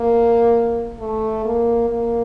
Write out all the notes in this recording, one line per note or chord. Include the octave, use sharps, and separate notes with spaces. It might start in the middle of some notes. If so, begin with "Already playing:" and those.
Already playing: A#3
A3
A#3
A#3